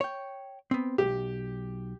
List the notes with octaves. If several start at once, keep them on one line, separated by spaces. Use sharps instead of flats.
C#5 G5
B3 C4
B1 G4